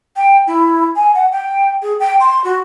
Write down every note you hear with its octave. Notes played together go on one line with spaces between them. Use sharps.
G5
E4
G#5
F#5
G5
G#4
G5
C6
F#4